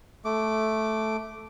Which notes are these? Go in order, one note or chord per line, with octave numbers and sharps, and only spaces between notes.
A3 D6